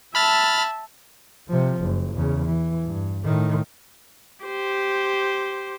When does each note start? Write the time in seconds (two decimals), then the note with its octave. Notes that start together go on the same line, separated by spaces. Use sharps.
0.15 E5 A5 B5 F6 A6
1.48 C3 F3
1.81 F#1
2.15 E2 C#3
2.46 E3
2.84 G2
3.25 A2 D#3
4.44 G4 C5